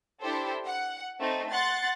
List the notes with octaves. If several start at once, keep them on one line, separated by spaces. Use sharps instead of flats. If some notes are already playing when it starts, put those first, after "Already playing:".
D4 E4 G4 A4 C5
F#5
A3 C4 D#4
F#5 C6 F#6 A6